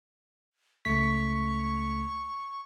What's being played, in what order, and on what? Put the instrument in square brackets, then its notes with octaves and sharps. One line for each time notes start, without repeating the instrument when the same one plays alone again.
[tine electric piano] C#2 A3 B6 [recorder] C#6